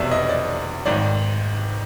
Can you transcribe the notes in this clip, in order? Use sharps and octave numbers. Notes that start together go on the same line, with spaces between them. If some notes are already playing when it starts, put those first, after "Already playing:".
Already playing: F1 E2 B2 D5 E5
D#5
D5
G#1 G#2 D#3 D5